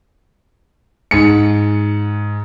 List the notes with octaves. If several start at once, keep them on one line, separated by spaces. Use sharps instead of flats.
G#2 C#7